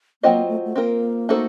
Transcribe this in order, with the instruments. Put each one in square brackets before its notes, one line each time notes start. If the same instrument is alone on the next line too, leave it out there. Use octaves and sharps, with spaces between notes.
[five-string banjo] F#3 C4 F4 C5 D#5 [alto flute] A#3
[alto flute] A3
A3
[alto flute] A#3 [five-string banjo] C4 F4 A#4
[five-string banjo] A3 D#4 F#4 A4 C5